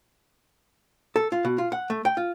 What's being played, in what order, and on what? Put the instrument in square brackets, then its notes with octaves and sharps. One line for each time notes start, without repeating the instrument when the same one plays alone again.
[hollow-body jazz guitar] A4
F4
B2
F4
F#5
A3
G5
F4